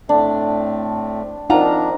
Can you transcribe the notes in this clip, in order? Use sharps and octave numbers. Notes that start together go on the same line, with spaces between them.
A2 A3 C4 D4
F3 C4 D4 D#4 F4 A#4 F#5 A#5